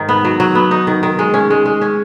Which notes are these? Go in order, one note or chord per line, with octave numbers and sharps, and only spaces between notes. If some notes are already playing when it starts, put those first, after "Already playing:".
Already playing: G#2 D#3 D#4
B3
F#3
F#3
B3
D#4
D#3
D#3
G#3
C#4
G#3
G#3
C#4